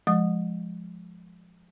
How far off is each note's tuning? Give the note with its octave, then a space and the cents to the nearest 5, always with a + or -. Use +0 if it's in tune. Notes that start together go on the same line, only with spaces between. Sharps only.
F3 +0 G#3 +0 D#6 -15